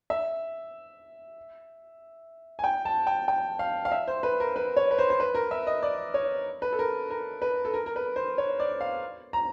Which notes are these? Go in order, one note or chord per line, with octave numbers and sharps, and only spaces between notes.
E5
G#5
G5
A5
G5
G5
F5
F5
E5
C5
B4
A#4
B4
C#5
B4
C5
C5
B4
A#4
E5
D#5
D5
C#5
B4
A4
A#4
A#4
B4
A4
A#4
A#4
B4
C5
C#5
D5
F5
A#5